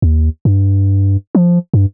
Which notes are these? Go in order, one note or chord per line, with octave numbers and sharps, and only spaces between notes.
D#2
G2
F3
G2